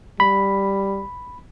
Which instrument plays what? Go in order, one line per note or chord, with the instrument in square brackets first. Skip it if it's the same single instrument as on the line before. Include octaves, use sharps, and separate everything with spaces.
[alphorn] G3 [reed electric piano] B5